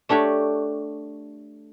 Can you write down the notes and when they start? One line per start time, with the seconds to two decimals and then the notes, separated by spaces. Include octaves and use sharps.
0.09 A3 D4 G4 C#5